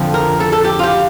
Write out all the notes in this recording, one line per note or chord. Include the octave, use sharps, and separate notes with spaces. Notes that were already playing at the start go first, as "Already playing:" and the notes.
Already playing: F2 D3 F3
A#4
A4
A4
G4
F4
G4